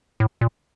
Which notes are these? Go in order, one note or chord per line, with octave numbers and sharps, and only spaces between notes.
A2
A#2